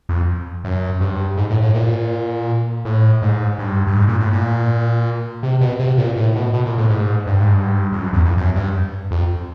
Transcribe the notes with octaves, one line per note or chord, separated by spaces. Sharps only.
F2
F#2
G2
G#2
A2
A2
A#2
A2
G#2
G2
G2
G#2
A#2
A2
A#2
C3
B2
C3
A#2
A2
B2
B2
A#2
A2
G#2
G2
G#2
G2
F2
F#2
E2
F2
F#2
G2
F2